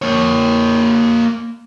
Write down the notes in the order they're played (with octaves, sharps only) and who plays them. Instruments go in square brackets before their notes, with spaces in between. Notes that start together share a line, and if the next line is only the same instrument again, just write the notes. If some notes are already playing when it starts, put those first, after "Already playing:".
[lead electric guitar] A#3 C#5